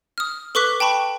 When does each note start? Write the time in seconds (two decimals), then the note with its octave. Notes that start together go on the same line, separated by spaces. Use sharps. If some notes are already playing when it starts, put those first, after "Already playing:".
0.18 D#6 F6
0.55 A4 B4 C#6 D6 F#6 B6
0.80 G5 A5 B5 C#6